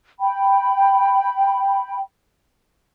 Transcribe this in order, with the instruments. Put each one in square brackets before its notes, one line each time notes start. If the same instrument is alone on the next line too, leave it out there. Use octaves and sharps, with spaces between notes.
[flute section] G5 B5